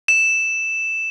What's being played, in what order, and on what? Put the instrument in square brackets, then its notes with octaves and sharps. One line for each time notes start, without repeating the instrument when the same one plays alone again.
[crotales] E7